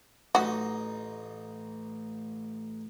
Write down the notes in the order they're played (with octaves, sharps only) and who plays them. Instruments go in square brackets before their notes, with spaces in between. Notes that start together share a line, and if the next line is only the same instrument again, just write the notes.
[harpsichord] A1 D#4 [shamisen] F#3 F#4